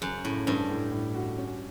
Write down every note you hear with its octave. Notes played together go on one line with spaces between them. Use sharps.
F#2 C#3
A2 C#3
G2 C#4
A2
A2
F#4
C#4